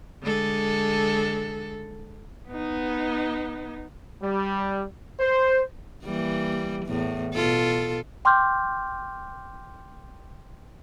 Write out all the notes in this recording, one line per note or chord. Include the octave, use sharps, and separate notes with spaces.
D3 G#3 A4
B3 D#4
G3
C5
E3 G3 A#3
E2 A2
B2 F4 A4
G5 C6 D6 F6 G6